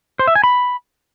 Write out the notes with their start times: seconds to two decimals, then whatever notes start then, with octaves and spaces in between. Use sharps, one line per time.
0.19 C5
0.27 E5
0.35 G#5
0.44 B5